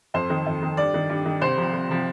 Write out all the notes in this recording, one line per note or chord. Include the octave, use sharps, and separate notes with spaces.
F2 C5
D#3
F2
D#3
G2 D5
D#3
G2
D#3
C2 C5
C3 F3
C2
C3 F3